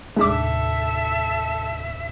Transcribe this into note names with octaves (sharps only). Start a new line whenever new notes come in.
D#2 A2 C3 G#3 D4 A4 E5 D6